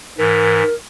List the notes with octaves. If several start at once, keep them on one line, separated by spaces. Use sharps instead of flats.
G#2 E3 A#4